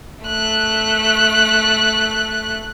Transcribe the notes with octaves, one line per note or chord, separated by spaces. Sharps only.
A3 F#6